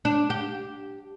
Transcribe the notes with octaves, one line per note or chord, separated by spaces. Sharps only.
D4
G4